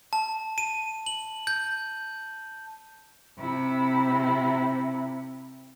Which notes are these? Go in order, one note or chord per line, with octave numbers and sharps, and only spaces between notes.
A5
D#7
F#7
G6
C3 E4